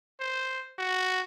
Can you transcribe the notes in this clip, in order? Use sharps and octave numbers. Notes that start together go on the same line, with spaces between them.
C5
F#4